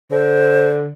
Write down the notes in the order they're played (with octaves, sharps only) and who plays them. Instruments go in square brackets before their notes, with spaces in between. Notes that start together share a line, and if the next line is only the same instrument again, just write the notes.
[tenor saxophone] D3 [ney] C5